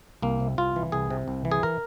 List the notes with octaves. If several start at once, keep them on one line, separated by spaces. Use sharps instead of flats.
C2 A#3
C3
C2 F4
E3
C2 G#4
C3
C2
E3
G#4
A#4